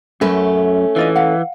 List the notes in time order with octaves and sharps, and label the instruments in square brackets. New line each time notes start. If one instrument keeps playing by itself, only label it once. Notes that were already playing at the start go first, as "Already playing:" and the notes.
[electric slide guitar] F#2 [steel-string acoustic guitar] A3 C#4 [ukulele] A#4 B4
[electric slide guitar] E3 [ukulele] D4 F4 D#5
[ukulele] F5 F#5